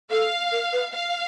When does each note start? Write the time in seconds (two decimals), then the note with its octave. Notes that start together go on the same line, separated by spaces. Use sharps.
0.10 A4 F5
0.52 A#4
0.73 B4
0.92 F5